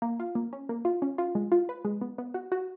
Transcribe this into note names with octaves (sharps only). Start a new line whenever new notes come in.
A#3
F4
A#3
C#4
A#3
F4
C#4
F4
G#3
F4
B4
G#3
B3
B3
F#4
F#4